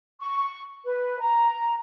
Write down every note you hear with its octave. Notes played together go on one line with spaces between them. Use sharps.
C#6
B4
A#5